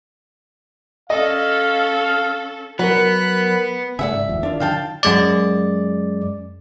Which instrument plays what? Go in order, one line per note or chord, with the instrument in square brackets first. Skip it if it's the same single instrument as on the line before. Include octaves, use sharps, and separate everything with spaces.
[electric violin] C#4 A4 [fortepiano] D#5 [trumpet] F5
[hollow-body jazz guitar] F#3 [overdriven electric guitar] B3 [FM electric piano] A#4 F#5 [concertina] B5 F#6
[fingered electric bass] C#3 F3 A3 [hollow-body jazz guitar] D5 F#5 G#5 [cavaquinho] E5
[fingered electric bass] G#2
F1 D#2 F3
[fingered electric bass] D#3 [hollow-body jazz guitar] D4 F4
[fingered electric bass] D3 D#3 F#3 [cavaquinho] F5 G5 A5
[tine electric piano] F#2 G#3 D5